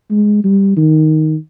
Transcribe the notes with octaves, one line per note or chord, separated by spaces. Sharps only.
G#3
G3
D#3